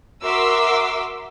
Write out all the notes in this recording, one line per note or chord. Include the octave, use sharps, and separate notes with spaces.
F#4 A#4 E5 C6 D6 E6